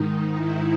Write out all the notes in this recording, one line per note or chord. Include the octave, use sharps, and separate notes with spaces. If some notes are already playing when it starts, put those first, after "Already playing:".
Already playing: G#2 D#3 D#4
E4